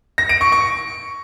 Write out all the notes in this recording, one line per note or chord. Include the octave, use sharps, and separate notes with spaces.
A#6
D7
C#6
C#6